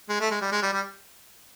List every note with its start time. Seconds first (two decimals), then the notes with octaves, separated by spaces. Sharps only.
0.09 G#3
0.20 A3
0.30 G#3
0.41 G3
0.51 G#3
0.62 G3
0.73 G3